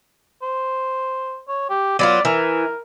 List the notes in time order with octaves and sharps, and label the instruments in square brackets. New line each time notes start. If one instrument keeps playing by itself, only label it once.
[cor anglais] C5
C#5
G4
[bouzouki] F#3 B3 F4 [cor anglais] D5
[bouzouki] E3 [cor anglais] A#4